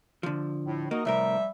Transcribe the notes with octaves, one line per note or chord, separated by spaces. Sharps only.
D3 F3
A2
A#3 D#4 F#4 D#5
C2 A2 F3 G3 A#4 E5